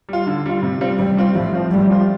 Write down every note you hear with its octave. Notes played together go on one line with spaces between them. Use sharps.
G3 F4
D3
G3 F4
C3
G3 C4 F4
C3 G3
G3 C4 F4
A2 F3
F3 C4 F4
A2 G3
F3 C4 F4